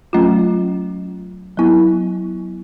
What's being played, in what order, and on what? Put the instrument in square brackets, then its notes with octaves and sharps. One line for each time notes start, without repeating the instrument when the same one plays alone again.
[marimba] F#3 A3 C#4 F4
F#3 B3 E4